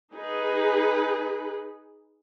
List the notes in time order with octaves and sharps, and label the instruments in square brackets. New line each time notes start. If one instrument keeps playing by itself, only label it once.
[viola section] D#4 G#4 B4